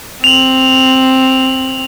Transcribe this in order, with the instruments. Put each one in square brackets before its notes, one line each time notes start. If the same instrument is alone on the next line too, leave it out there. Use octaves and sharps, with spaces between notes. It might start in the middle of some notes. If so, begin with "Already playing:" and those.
[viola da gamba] C4 [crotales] F7 F#7